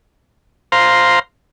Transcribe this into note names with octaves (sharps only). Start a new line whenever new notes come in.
C5 F5 A#5 C6